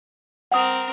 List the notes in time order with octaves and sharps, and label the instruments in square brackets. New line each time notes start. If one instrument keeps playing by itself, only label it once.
[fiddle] C4 A#4 [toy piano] F#5 D#6